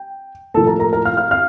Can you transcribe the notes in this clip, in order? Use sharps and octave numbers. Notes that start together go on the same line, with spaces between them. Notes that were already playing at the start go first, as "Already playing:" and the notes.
Already playing: G5
A2 F3 A#3 A4 A5
A#4 A#5
A#4 A#5
A#4 A#5
F5 F6
F5 F6
F5 F6